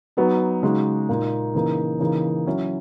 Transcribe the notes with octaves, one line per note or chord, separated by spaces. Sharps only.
F#3 B3 D#4 F#4
C#3 G#3 D#4 F#4
A#2 A#3 D#4
C#3 E3 A#3 D#4
C#3 E3 A#3 D#4
F#3 C#4 E4